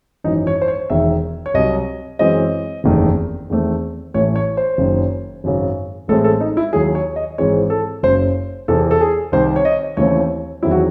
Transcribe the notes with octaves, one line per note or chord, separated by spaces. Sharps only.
G#1 F#2 E3 D#4
C#5
C5
C#5
E1 E2 D#3 E5
C#5
C2 C3 F#3 D#5
F#2 E3 G#3 C4 D#5
F#1 E2 C3 D#3 A3
E2 D#3 A3 C4
A1 A2 E3 A3 C#5
C#5
C5
F#1 F#2 D#3
G#1 F#2 C#3
A1 A2 G#3 C4 A4
A4
D#4
E4
D#2 D#3 F#3 G#4
C#5
D#5
G#1 G#2 E3 G#3 C4 C#5
A4
F#1 F#2 C#3 C5
E2 C3 E3 C4 A4
A4
G#4
C2 C3 D#3 C5
C#5
D#5
D#2 C#3 E3 A3 C4 C#5
E2 D#3 F#3 C4 E4
F#4